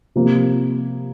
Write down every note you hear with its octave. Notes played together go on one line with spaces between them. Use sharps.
C3 F3 A#3